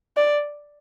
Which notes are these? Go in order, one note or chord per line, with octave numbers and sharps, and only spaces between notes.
D5